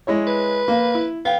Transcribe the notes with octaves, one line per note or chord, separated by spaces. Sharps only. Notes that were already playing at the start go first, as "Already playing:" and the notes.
G#3 E4 C#5
B4
A#3
E4
B3 F5 G5